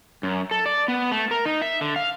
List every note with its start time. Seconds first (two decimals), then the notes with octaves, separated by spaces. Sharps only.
0.23 F#2
0.51 A4
0.66 D5
0.88 B3
1.12 A3
1.31 A#4
1.46 D#4
1.62 E5
1.81 D3
1.96 F5